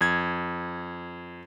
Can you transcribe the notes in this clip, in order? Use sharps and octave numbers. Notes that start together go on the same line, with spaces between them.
F2 G#6